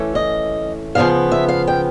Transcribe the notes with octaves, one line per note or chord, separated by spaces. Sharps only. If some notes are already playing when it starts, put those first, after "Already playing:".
Already playing: E3 A3 C#4
D#5
C#3 F3 G#3 B3 F5
E5
F5
G5